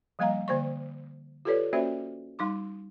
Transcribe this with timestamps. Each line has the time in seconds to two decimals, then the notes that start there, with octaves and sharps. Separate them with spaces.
0.19 F3 G3 A#3 D#5 F5 A#5
0.48 D3 A#3 C5 D5 C#6
1.45 F4 G4 A4 B4 C#5 D5
1.73 A#3 C#4 F#4 C5 D5 E5
2.39 G3 D#4 C6 D6